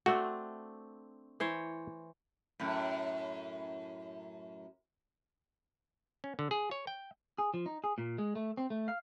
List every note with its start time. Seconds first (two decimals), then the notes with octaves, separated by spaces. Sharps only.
0.06 A3 C4 D4 F#4
1.40 E3 C5 C#5
2.59 F#2 A2
6.24 C#4
6.39 D3
6.51 G#4
6.71 C#5
6.87 G5
7.38 G#4
7.54 F3
7.66 D#4
7.84 G#4
7.98 A#2
8.18 G#3
8.35 A3
8.57 C4
8.70 A3
8.88 F5